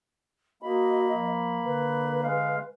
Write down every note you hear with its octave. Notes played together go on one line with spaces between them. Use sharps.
A#3 F#4 D#5 B5
F3
D3 B4
G#3 F5